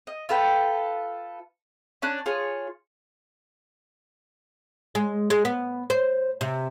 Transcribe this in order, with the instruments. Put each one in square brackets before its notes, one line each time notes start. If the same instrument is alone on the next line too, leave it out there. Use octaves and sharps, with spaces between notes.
[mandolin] D#5
F4 A4 B4 G5
C#4 D4 F#6
F4 G#4 C#5
[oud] G#3
G#3
B3
C5
C3